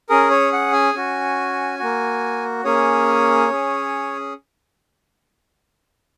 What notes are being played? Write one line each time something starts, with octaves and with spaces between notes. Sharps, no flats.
C#4 G#4 A#4
C#5
F#5
G#5
C#4 F#4
A#3 F#4
A#3 C#4 G#4 C#5
C#4 G#4